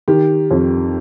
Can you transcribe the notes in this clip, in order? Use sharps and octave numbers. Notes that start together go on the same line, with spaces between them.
D#3 G4
F2